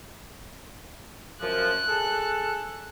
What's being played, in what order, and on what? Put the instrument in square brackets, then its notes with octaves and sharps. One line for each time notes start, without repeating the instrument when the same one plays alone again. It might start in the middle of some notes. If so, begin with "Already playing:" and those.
[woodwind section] F#2 F3 [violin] F#6
[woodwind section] G#4 A4